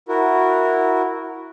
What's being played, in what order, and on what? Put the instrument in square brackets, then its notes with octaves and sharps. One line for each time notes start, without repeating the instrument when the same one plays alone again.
[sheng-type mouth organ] E4 F#4 A#4